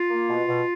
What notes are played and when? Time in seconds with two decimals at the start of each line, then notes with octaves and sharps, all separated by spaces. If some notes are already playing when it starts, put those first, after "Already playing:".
Already playing: F4
0.10 A#3
0.29 B2
0.47 B2